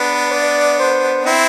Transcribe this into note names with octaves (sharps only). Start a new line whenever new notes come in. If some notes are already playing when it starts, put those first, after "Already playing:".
Already playing: B3 D4 B4
D5
C5
C4 E4